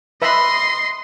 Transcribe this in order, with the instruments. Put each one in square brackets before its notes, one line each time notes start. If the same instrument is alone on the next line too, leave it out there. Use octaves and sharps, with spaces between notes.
[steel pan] B4 E5 B5 [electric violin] D#5 C6